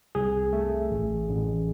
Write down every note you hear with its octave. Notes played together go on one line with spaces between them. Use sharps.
C2 G#4
A3
A1
A1